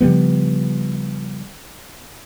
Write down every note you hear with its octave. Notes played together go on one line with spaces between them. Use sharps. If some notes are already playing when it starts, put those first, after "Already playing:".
C#3 F3 G3 B3